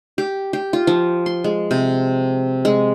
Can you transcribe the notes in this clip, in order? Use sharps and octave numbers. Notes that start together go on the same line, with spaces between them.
G4
G4
F4
F3
C6
G#3
C3
G#3